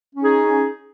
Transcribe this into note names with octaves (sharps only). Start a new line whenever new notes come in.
C#4 D#4 G#4